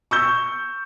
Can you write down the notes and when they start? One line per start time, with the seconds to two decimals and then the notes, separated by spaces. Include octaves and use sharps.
0.11 C#6 E6 G6